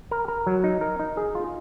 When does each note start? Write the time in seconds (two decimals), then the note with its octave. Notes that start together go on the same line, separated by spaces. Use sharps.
0.11 A#4
0.28 A#4
0.47 F#3
0.64 D#4
0.81 A#4
0.99 D#4
1.17 G#4
1.35 F4